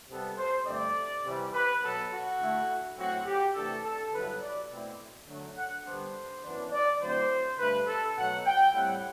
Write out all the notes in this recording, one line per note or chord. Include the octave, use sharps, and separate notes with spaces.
C3 G3 B3 A4
C5
G2 D3 A3 C4 D5
C3 E3 G3
B4
B2 F#3 B3 A4
F#4
D3 A3 E4
A2 F#3 A3 C4 E4 F#4
G4
C3 E3 A3 D4 A4
A4
G2 D3 F#3 B3 E4 B4
D5
B2 A3 C4 E4
D3 F#3 A3
F#5
D3 G3 B3 D4 C5
F#2 E3 B3 D4
D5
D3 F#3 A3 C4 E4 C5
G2 D3 A3 B4
A4
B2 F#3 A3 F#5
G5
A2 G3 C4 E4 F#5